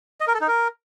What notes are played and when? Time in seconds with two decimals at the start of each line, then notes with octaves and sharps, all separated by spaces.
0.21 D#5
0.27 A#4
0.34 A4
0.41 D#4
0.48 A#4